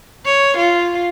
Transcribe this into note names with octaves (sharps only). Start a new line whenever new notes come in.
C#5
F4